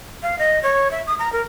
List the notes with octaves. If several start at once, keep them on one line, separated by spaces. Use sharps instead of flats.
F5
D#5
C#5
E5
D#6
A#5
A#4